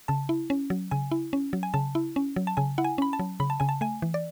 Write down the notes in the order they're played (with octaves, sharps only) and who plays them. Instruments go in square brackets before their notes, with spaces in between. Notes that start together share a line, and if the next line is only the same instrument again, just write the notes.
[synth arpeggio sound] C#3 A5
E4
C#4
F#3
C#3 G#5
E4
C#4
F#3
G#5
C#3 A5
E4
C#4
F#3
A5
C#3 G#5
E4 F#5
G#5
C#4 B5
A5
F#3
C#3 B5
A5
C#3 G#5
A5
A3 G#5
E3
D5